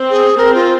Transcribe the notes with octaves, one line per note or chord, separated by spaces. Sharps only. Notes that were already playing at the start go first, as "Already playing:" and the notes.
Already playing: C4
G#4
C4 A#4
F4